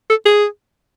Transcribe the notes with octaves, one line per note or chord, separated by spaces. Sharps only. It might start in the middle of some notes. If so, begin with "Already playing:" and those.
A4
G#4